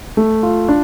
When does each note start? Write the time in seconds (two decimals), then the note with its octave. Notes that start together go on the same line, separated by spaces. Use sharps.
0.17 A3
0.43 F4
0.68 D4